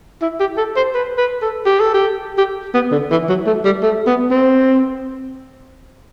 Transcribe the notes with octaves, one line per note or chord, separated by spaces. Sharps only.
E4
G4
A4
C5
B4
B4
A4
G4
A4
G4
G4
B3
D3
E3
F#3
A3
G3
A3
B3
C4